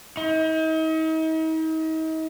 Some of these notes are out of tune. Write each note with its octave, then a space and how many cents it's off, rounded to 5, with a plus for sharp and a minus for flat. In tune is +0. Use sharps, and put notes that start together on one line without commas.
D#4 +40